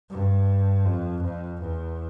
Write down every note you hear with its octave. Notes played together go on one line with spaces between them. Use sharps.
G2
F2
F2
E2